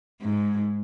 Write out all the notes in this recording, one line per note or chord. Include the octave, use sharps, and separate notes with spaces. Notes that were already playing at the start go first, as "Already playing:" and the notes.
G#2